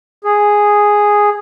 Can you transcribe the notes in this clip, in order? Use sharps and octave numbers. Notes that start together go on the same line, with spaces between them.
G#4